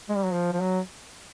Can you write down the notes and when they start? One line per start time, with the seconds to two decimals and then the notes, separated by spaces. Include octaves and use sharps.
0.09 G#3
0.16 G3
0.25 F#3
0.33 F3
0.53 F3
0.60 F#3